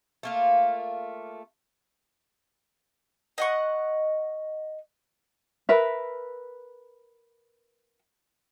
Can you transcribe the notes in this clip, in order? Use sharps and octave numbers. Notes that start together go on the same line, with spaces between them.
A3 A#3 F4
D#5 F#5 C#6
A#4 B4 E5